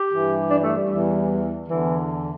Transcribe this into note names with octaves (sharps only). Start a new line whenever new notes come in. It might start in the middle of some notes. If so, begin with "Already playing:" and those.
Already playing: G4
G2 E3
D4
G3
A3
G3
E2 E3
E2 D3 E3